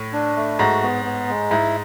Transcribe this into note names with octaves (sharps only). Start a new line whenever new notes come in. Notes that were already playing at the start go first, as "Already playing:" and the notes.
Already playing: A2
D4
A3
G#2 F#4
B3
B3
G#3
G#2 E4